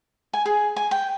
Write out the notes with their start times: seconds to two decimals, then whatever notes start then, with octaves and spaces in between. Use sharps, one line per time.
0.33 G#5
0.46 G#4
0.76 G#5
0.91 G5